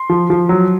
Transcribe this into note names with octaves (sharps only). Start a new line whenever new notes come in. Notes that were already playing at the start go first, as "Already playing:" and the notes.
Already playing: C6
F3
F3
F#3